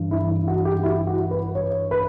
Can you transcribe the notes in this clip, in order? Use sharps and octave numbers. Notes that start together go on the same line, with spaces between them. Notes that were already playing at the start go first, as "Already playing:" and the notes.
Already playing: G2 E3
E4
E4
F#4
G4
F#4
E4
F#4
B4
C#5
B4